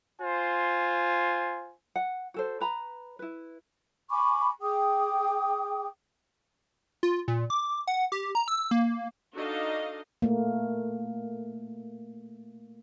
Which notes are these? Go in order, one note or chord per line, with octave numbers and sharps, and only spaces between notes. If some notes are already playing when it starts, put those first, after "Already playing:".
F4 C5 G#5
F#5
F#4 A4 C5
B4 A#5 B5
E4 B4
G#5 B5 C#6 D6
G#4 G5 D6 D#6
F4
A#2
D6
F#5
G4
A#5
E6
A#3
D4 D#4 F#4 A4 D#5 F5
A3 A#3